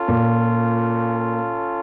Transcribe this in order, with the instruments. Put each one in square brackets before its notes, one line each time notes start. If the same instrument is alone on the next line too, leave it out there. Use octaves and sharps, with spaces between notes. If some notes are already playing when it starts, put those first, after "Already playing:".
Already playing: [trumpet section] C#4 F4 A4
[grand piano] A#2